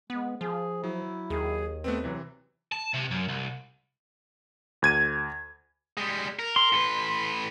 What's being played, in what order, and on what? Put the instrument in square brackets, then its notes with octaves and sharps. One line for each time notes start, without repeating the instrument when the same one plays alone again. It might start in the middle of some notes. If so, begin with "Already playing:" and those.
[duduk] G#3 [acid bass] B3
[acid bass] F3 [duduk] G#4
[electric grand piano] F#3 [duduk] E4
[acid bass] D#2 [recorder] G#4
[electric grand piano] A3 B3 C4 [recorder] B4
[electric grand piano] C3 E3 [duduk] F#3
[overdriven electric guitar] A5
C3
F#2
C2
[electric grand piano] D2 G#6 D#7
[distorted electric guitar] G3 G#3
A#4
[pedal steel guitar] C6
[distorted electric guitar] A2 B4